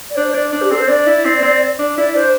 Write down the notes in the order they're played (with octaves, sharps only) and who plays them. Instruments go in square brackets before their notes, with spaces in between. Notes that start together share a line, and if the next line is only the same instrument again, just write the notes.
[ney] D5
[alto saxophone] D4 [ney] C5
[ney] C5
[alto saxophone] D4 [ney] D5
[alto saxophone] D4 [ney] C5
[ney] G4
[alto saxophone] C4 [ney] A4
[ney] C5
[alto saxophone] D4 [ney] D5
[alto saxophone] E4
C4
C4
D4
[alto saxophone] E4 [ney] D5
[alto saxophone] D4 [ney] C5